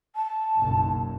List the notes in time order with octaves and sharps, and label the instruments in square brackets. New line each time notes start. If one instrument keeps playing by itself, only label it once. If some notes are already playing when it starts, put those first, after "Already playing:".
[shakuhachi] A5
[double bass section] F#1 B1 F#2